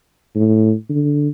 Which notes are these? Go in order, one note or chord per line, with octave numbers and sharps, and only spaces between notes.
A2
D3